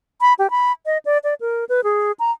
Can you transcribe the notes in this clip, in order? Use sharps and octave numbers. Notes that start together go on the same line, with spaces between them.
B5
G4
B5
D#5
D5
D5
A#4
B4
G#4
A#5